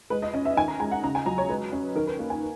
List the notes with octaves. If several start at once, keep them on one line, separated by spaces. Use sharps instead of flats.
G#3 B4
D#5
C#4 D#5
E5
D#3 G#5
A#5
G#3 G#5
F#5
C#3 A#5
G#5
F#3 A#5
C#5
G#3 B4
C#4
D#3 A#4
B4
A#3
G#5